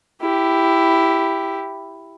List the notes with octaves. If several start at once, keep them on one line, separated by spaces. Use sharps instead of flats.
E4 G4